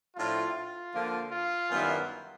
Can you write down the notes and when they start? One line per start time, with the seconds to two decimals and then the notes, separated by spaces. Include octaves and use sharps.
0.16 A2 F3 A3 D4 F4
0.54 F4
0.93 D3 F3 A#3
1.32 F4
1.70 F#2 D#3 G3 B3 E4